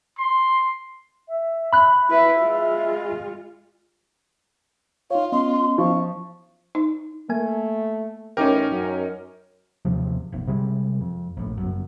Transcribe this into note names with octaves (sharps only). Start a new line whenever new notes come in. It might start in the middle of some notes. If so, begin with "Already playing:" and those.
C6
E5
B5 F#6
E4 B4 E5
G#3 F4
D#4 F4 C#5 F5
B3 C#4 D#5 C6
F3 F5 C#6
D#4
A3 A#3 G#5
A1 C#4 D#4 A#4 G5 D6
F#2
A1 D#2 C3 F3
F1 B1
C3 G3 G#3
F2
A#1 A2
G1 F#2